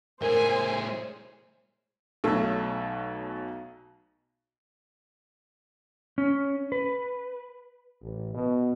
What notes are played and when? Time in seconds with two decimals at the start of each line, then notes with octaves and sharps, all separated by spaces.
0.22 A2 G#4 A#4 C5 G#5
2.24 B1 B2 F#3 A3
6.18 C#4
6.72 B4
8.02 A1
8.34 B2